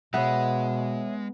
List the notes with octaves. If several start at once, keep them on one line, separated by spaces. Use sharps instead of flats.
B2 G#3 B3 C#5 E5